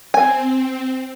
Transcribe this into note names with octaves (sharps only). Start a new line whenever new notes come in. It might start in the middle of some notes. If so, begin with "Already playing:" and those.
C4 G#5